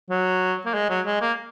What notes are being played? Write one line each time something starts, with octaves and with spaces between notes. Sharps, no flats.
F#3
A#3
G#3
F#3
G#3
A#3